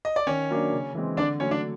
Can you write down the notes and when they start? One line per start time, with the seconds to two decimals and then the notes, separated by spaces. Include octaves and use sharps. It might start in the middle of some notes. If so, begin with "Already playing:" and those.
0.05 D#5
0.16 D5
0.27 D#3 C#4 C#5
0.50 F#3 A#3 D4
0.72 C#3
0.95 E3 G#3 C4
1.17 D3 D4 D5
1.40 F#3 A3 C#4 C#5
1.51 D4 D5